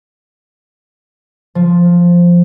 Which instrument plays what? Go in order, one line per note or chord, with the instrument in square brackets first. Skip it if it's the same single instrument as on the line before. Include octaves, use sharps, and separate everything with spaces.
[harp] F3